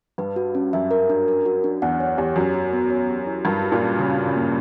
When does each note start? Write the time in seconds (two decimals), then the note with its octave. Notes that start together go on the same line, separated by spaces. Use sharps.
0.18 G2 B4
0.36 F#4
0.55 C#4
0.73 F#2 E5
0.91 A#4
1.10 D4
1.28 A#4
1.46 F#4
1.64 D4
1.82 E2 F#5
2.00 C#5
2.18 E2 G4
2.36 F#2 C#5
2.54 F#4
2.73 B3
2.90 C#5
3.09 G4
3.27 E4
3.45 G2 A#4
3.63 F#4
3.72 A#2
3.81 C#4
3.99 C#3 F#4
4.17 C#4
4.26 C#3
4.36 A#3